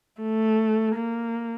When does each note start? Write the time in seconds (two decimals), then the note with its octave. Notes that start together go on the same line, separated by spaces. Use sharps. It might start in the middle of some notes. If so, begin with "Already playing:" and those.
0.22 A3
0.95 A#3